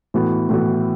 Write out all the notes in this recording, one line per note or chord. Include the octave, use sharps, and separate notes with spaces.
A2 E3 B3 F#4
A2 E3 B3 F#4